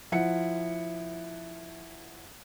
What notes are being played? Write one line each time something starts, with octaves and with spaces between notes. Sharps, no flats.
F3 E4 F#5 C#7